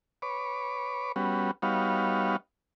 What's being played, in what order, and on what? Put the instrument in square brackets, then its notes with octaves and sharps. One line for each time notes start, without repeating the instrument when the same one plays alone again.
[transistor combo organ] B4 C#5 D6
G3 B3 C#4 F#4
G3 B3 D#4 F#4 C#5 F5